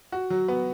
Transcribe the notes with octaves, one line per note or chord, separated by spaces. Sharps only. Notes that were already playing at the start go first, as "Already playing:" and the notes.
F#4
F#3
B3